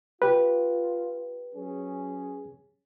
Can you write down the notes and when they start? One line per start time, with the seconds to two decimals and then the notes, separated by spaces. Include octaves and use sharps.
0.22 F4 G4 B4
1.55 F#3 C#4 G#4